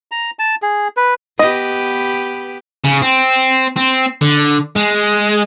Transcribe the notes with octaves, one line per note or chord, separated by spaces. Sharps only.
A#5
A5
G#4
B4
B3 G4 B4 D#5
C#3
C4
C4
D3
G#3